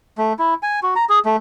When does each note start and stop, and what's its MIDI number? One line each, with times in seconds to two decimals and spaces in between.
0.18 0.33 57
0.39 0.54 64
0.63 0.80 80
0.83 0.94 66
0.96 1.05 82
1.09 1.19 68
1.25 1.36 57